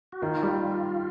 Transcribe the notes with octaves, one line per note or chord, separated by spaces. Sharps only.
F#4
D#3 F4
G3